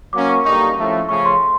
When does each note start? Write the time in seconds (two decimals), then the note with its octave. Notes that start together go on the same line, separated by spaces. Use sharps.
0.13 F#3 A#3 C#4 D6
0.29 C#6
0.45 G2 D3 G3 A#3 D#4 C#6
0.78 A2 F3 A3 C#4
1.09 C#3 F3 A3 C#4 C#6
1.25 C6